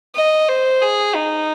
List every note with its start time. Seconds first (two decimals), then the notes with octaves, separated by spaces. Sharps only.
0.16 D#5
0.49 C5
0.82 G#4
1.15 D#4